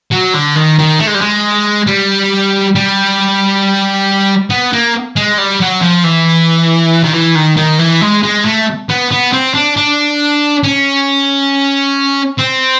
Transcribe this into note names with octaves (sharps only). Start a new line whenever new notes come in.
F#3
D3
D#3
D#3
A3
G#3
G3
G#3
G3
G3
B3
A#3
G#3
G3
F#3
F3
E3
D#3
E3
D#3
D#3
E3
G#3
G#3
A3
B3
B3
C4
D4
D4
C#4
C4